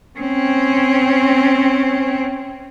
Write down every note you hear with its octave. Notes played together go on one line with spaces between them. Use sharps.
C4 C#4